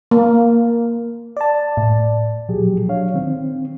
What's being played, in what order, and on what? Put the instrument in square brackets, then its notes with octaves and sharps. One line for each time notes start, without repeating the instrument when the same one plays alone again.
[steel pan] A#3
[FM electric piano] D5 A5
[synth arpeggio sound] A2
[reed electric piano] D2 A#2 F3 F#3 G4 G#4
F#3 D4 C#5 F5
D#3 C4